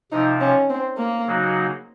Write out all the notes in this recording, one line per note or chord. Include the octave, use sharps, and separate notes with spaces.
C3 F3 C4 D#4
C#4
C4
A#3
C#3 F#3 A#3 D#4 F#4